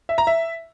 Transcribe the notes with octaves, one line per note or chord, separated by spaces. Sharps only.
E5
A#5
E5